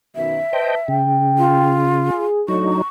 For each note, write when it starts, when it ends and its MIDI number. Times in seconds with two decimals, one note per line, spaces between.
0.16 0.38 42
0.16 0.38 47
0.16 0.38 51
0.16 0.96 76
0.53 0.77 71
0.53 0.75 72
0.53 0.75 75
0.53 0.75 79
0.53 0.77 81
0.88 2.10 49
0.88 1.76 79
1.38 2.23 65
2.07 2.42 68
2.48 2.76 45
2.48 2.82 54
2.48 2.76 62
2.48 2.82 63
2.48 2.76 69
2.48 2.88 85